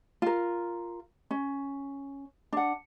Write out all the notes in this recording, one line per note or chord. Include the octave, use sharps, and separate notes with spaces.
F4 A#4
C#4
D4 F#5